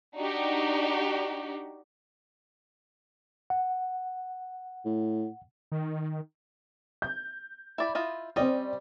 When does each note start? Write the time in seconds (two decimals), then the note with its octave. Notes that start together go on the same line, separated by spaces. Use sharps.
0.18 D4 D#4 F#4 G4
3.50 F#5
4.85 A2
5.72 D#3
7.02 G6
7.78 E4 D5 B5
7.95 E4 F4 D#5
8.36 G3 C4 C#4 D5 D#5